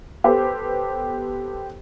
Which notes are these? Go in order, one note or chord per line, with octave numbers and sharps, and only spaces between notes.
B3 G4 A4 C5